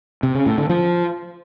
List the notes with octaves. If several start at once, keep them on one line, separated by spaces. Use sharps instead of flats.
C3
C#3
A2
D3
F3